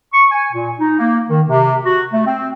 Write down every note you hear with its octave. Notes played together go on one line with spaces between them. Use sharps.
C#6
G#5
A#2
D#4
A#3
D#3
C3
F#4
A3
C4